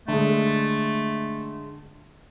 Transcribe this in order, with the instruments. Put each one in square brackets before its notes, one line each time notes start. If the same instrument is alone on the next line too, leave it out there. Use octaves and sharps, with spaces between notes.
[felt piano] D3 G#3 [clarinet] A3